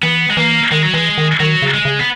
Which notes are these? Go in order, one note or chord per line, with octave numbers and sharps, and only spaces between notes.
E3 B3
G#3
E3 A#3
D#3 G#3
F#3
E3 G#3
D#3
D#3 F#3
C#3
G#3
C#3
B3